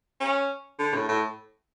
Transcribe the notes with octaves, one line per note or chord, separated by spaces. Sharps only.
C#4
D3
A2
A2